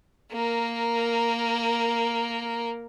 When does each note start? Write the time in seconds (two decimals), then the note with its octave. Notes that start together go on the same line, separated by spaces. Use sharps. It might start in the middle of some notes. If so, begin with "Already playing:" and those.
0.32 A#3 A#4